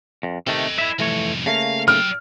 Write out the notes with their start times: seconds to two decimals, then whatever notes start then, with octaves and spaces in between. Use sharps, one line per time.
0.23 F2
0.47 C3 D#3 A3 A4 D#5
0.78 E4 E5
0.99 C2 F2 E3 A3 C#5
1.46 C#3 A3 A#3 F5
1.88 F#3 G5 F6